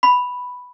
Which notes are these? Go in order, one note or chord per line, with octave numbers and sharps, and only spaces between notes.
B5